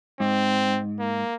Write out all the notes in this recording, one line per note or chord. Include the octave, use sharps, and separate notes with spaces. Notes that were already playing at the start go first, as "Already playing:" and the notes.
G#2 C4
A#3